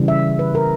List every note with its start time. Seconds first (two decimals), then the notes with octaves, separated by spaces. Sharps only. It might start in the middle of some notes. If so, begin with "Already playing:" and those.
Already playing: C#3 E3 G3
0.08 E5
0.39 B4
0.55 A#4